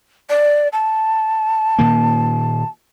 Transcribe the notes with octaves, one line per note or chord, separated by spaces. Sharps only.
D5
A5
A#2 D#3 A#3